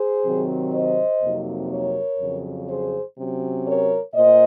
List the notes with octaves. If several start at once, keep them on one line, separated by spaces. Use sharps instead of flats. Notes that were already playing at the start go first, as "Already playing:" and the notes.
Already playing: G#4 C5
C3 D#3 F#3 C4
C5 D#5
F2 C3 F#3 A#3 D#4
A#4 C#5
F2 C#3 F#3
G#4 C5
C3 F#3 C#4
A#4 C#5
A#2 C5 D#5